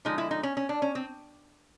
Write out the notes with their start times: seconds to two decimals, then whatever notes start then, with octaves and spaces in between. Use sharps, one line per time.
0.05 D3 F3 G#3 D#4
0.18 E4
0.31 D#4
0.43 C#4
0.57 C#4
0.69 D4
0.82 C#4
0.95 C4